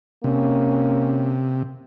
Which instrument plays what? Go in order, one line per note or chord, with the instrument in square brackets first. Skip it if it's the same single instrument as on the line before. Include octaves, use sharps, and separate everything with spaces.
[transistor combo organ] C3 [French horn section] A#3 C#4